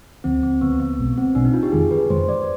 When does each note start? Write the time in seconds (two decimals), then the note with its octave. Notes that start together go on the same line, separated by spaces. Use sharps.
0.24 D2 D3 F3 C4
0.43 C4
0.61 D2 D3 F3 B3
0.80 B3
0.99 B1 B2 G#3 C4
1.18 C4
1.35 B1 B2 G#3 C4 D4
1.45 D#4
1.54 F4
1.63 G4
1.72 F2 D#3 G#3 G#4
1.91 B4
2.10 F2 D#3 G#3 C5
2.29 D5